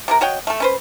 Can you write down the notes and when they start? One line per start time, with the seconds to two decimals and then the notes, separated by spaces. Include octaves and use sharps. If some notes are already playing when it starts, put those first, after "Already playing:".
0.08 C3 F#3 A#4
0.21 F#4 C#5 D#5 G5
0.47 A3 A4
0.60 C#4 B4 C5